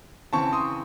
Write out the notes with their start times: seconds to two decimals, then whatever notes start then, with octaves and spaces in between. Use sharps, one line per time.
0.33 C#3 E3 C4 A5 C#6
0.53 C6 D#6